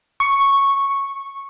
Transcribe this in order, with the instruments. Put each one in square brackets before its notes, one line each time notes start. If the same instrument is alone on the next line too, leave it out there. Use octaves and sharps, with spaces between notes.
[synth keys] C#6